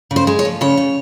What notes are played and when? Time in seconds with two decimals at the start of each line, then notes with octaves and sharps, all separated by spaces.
0.11 C#3
0.16 C5
0.27 G#3
0.39 C#5
0.45 F3
0.61 C#3 C#5
0.77 C#3